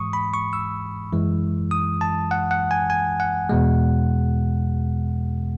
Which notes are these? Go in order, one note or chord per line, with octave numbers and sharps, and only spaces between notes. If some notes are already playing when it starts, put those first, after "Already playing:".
Already playing: G#2 E3 G#3 C#6 D#6
B5
C#6
E6
F#2 E3 G#3
D#6
A5
F#5
F#5
G#5
G#5
F#5
E2 B2 G#3